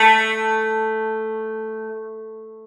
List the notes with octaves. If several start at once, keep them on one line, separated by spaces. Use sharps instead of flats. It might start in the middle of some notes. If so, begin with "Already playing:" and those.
Already playing: A3